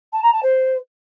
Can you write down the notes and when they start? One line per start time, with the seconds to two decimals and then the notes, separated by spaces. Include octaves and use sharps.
0.13 A5
0.23 A#5
0.33 A5
0.43 C5